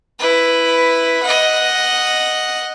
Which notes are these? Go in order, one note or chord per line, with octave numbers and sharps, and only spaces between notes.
E4 B4
D#5 F#5